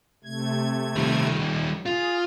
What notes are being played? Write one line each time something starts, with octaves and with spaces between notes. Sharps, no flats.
C3 A3 G#6
D#3 G3
F4 G#4